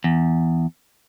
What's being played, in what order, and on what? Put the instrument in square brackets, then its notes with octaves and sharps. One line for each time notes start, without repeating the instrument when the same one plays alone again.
[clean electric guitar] E2